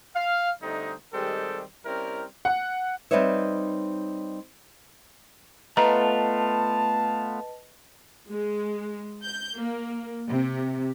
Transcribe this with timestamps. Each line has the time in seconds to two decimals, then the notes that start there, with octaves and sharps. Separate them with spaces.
0.15 F5
0.62 D3 G3 A3 C4 D#4
1.13 D#3 G3 G#3 C4 G4 A4
1.86 G3 C4 C#4 E4 A#4
2.45 F#5
3.11 G3 C4 D#4 B4 C#5 E5
5.77 A3 B3 F4 B4 D#5 A5 A#5
8.29 G#3
9.24 G6
9.57 A#3
10.27 C3